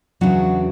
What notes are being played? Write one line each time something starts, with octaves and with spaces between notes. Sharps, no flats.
E2 C#3 F#3 D4 F#4